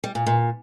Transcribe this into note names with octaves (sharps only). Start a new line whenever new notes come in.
G3
A#2
A#2